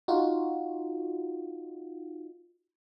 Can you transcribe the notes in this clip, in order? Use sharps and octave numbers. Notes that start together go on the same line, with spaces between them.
D#4 F4 F#4